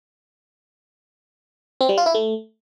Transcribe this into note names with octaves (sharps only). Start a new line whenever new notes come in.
C4
G3
F4
E4
A3